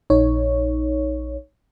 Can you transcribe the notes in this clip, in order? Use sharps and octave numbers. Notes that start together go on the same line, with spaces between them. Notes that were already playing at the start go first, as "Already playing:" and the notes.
A#1 D#4 C#5